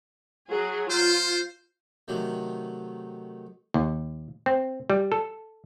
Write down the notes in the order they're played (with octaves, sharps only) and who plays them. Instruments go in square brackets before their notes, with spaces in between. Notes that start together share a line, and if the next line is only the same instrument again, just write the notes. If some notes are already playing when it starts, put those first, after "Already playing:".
[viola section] F#3 G#4
[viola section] F4 [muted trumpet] C5
[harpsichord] C3 D#3 F#3 A3
[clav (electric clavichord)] D#2
C4
G3
A4